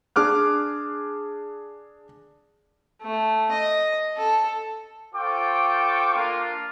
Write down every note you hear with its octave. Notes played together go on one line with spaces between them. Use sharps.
D4 G#4 D6 F6 F#6
A3
D#5
A4
F4 A4 C5 G5 C#6 D6
A#3 D4 F4